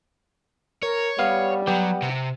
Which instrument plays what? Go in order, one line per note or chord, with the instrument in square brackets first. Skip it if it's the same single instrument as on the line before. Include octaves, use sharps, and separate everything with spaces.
[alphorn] A#4 [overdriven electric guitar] C#5
[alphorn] G3 [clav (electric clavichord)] B3 F5
[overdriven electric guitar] F#3 [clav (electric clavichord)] B3 G4
[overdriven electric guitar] C3